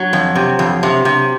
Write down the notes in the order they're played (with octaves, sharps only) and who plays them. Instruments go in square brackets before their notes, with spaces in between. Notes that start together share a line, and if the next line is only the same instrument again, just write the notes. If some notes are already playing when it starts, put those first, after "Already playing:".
Already playing: [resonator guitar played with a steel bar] F#3
F2
C3
F2
C3
C3